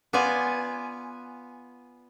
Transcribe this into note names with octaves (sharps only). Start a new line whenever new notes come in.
B3 F4 D5 G#5